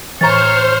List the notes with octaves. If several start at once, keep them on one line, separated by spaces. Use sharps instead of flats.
A2 E3 C5 C#5 A#5 C#6 F6 A6